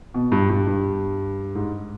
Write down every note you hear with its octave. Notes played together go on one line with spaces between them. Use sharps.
B2
G2
G2
G2
G#2